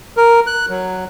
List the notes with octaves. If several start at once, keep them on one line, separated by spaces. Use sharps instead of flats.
A#4
F#6
F#3